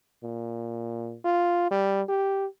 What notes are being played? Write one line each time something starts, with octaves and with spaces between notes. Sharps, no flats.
A#2
F4
G3
G4